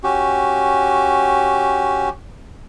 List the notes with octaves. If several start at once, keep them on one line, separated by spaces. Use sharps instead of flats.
C#4 F#4 G4